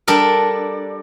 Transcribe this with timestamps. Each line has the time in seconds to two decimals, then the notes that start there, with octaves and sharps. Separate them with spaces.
0.08 G3 D4 A4 A#4